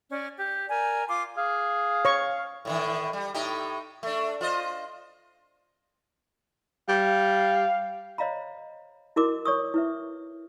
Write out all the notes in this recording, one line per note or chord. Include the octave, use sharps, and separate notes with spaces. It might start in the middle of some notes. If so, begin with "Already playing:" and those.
C#4 D5
G4
A#4 D5 G#5
F4 C6 D6
G#4 F5
C#5 C#6
A2 D3 D#3
G3
A2 D#4 G4
A3 D4
F4 C5 D#5
G3 F5
C5 C#5 D#5 F5 A#5 B5
E4 F#4 A#4 D#5 D6
C#5 C#6 D#6
E4 B4 E5